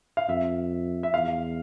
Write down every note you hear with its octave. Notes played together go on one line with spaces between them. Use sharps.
F5
F2 E5
E5
E2 F5